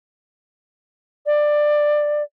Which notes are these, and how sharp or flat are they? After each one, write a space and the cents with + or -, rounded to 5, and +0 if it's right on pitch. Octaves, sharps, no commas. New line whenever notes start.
D5 +15